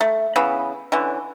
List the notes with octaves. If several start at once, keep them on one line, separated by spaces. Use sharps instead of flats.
A3
C#3 E3 B3 B5
D3 E3 C#4